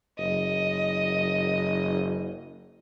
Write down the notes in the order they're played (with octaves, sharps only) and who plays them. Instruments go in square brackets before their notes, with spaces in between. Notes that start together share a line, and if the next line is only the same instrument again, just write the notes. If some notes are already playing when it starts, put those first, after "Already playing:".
[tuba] F#1 [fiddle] D#5